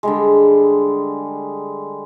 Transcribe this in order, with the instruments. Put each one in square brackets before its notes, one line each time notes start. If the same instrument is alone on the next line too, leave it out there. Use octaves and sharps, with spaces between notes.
[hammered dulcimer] D3 G3 G#3